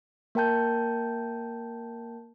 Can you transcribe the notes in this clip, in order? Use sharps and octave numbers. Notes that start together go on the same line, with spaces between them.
A#3 A#4 G5 A5 G6